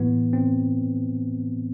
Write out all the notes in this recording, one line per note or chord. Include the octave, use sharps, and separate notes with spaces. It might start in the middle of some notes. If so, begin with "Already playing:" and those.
Already playing: A2 E3 B3
C4